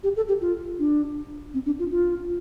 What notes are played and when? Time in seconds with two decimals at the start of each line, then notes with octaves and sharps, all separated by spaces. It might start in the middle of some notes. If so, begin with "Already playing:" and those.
0.03 G4
0.16 A4
0.28 G4
0.41 F4
0.79 D4
1.54 C4
1.66 D4
1.79 F4
1.91 F4